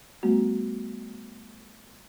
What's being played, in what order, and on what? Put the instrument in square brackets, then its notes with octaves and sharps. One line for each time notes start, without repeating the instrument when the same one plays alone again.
[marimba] G3 A3 B3 F#4